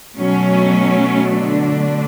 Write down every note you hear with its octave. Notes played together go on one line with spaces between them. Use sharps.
B2 F#3 A3 C#4
D3 D4
B2 A3